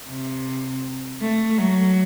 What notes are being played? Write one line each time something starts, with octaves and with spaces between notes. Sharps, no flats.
C3
A3
F#3